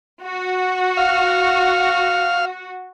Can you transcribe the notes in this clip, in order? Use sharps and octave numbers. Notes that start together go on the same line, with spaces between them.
F#4
F5